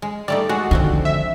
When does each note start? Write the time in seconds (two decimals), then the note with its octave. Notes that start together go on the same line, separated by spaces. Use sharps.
0.02 G#3
0.28 G3 A3 D#4 D5
0.49 G#3 F#4
0.71 D3 D#3 F3 C4
1.05 E5